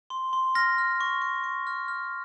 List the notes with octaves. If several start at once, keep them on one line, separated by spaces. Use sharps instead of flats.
C6
C6
F6 A#6
F6
C#6
C#6
C#6
F6
F6